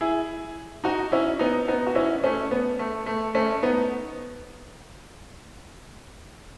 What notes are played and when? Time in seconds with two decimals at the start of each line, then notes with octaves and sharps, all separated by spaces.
0.01 E4 G#4
0.84 D#4 F#4
1.12 C#4 E4
1.39 B3 D#4
1.68 B3 D#4
1.87 F#4
1.95 C#4 E4
2.24 A3 C#4
2.51 B3
2.79 A3
3.06 A3
3.35 A3 C#4
3.63 B3 D#4